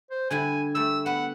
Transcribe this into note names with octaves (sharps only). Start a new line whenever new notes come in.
C5
D3 G3 E4 G#5
G3 A3 E6
B3 B4 F#5